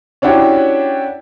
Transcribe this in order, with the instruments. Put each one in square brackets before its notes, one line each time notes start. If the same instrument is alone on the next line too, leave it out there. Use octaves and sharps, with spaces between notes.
[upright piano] C#4 D4 E4 F#4 G4 C#5